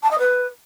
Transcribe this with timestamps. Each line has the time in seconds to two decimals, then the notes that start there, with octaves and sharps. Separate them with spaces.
0.03 A5
0.11 D#5
0.19 B4